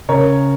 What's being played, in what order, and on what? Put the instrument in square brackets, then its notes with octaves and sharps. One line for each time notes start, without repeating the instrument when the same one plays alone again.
[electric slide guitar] C#3 [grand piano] A#4 C#5